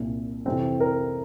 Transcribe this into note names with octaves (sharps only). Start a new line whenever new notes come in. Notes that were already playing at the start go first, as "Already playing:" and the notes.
Already playing: C2 A#2
F2 C3 E3 C4
A#4